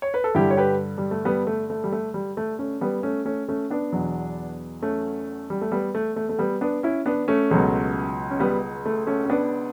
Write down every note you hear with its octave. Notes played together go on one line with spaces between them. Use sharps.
C#5
B4
A4
G2 D3 G3 E4 G4
C#5
G4 B4
G3
A3
G3 B3
A3
A3
G3
A3
G3
A3
A3 C#4
G3 B3
A3 C#4
A3 C#4
A3 C#4
B3 D4
E2 B2 F#3
A3 C#4
G3
A3
G3 B3
A3
A3
A3
G3 B3
B3 D4
C#4 E4
B3 D4
A3 C#4
C#2 B2 F#3
C#4
G3 B3
A3
A3 C#4
C#4
B3 D4